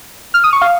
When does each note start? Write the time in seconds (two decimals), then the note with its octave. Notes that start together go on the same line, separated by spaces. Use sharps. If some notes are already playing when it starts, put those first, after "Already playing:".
0.34 F6
0.44 D#6
0.53 C#6
0.62 F5